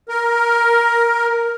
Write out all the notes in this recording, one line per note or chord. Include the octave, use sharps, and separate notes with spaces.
A#4